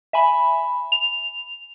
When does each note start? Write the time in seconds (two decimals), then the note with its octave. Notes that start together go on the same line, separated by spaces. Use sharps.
0.13 E5 G#5 B5
0.92 F7